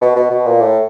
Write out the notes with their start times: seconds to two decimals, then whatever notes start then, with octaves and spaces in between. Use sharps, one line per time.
0.01 B2
0.16 B2
0.30 B2
0.46 A#2
0.61 A2